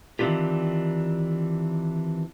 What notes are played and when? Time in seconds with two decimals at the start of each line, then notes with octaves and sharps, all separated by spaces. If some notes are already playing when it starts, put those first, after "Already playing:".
0.19 D#3 E3 C4 D4 F4 G4